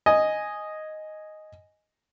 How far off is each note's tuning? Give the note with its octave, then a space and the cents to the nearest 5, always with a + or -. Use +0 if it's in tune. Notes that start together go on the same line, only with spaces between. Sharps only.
D#5 +0 G#5 +0